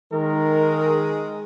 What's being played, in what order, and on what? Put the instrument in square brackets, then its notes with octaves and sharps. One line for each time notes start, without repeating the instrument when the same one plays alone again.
[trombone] D#3 [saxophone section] G#3 [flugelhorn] A#4